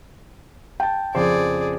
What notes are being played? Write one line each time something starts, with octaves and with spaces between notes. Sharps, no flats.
G5 A5
F2 C#3 G#4 C5 D5